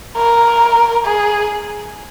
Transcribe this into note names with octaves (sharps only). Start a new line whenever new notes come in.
A#4
G#4